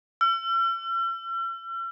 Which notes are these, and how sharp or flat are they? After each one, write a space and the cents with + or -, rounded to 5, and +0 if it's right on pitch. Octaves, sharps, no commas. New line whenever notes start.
E6 +45